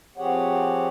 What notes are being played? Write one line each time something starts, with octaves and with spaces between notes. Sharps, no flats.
F3 C4 G4 G#4 C#5 F#5